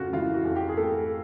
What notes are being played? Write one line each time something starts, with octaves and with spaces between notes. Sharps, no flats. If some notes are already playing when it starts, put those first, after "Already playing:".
Already playing: F2 C#3 A3 F4 F#4
E3 F4
F#4
F2
G4
G#4
A3 A4